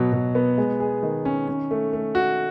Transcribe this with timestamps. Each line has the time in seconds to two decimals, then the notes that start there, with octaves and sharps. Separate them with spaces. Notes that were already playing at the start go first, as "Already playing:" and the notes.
Already playing: B2 F#3
0.13 B2
0.35 B3
0.58 G#3
0.80 G#4
1.03 D#3
1.25 C#4
1.48 C#4
1.71 A3
1.93 A3
2.15 F#4